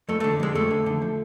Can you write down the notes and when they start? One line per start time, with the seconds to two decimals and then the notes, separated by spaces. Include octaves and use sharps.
0.09 F2 A3
0.20 D3 A3
0.40 F2 G#3
0.55 F2 A3
0.71 D3
0.86 D3
1.02 F3